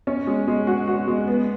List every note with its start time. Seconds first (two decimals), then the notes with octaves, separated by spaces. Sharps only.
0.07 C#4
0.27 G#3
0.48 G#3
0.67 F#4
0.88 F#4
1.08 G#3
1.27 B3